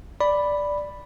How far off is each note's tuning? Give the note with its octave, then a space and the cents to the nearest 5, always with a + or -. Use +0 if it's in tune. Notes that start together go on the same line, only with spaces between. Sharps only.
D5 +0 B5 +0